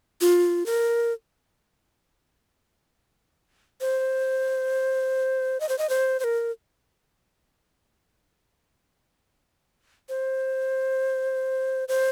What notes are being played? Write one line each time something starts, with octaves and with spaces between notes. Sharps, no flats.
F4
A#4
C5
D#5
C5
D#5
C5
C5
A#4
C5
C5